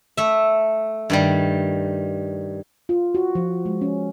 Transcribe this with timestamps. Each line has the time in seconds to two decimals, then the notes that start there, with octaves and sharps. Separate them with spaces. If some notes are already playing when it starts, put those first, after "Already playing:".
0.17 A3 E5
1.10 G2 D#3 G3
2.89 F4
3.15 F#4
3.35 F3
3.65 G#3
3.81 C#4